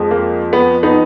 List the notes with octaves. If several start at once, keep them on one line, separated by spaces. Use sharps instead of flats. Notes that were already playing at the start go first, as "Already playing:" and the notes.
Already playing: F2 F3 G#3
A#3
B3
B3 D#4